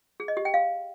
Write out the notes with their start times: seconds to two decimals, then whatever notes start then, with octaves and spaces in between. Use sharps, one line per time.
0.20 G#4
0.28 D#5
0.37 G4
0.45 G5
0.54 F5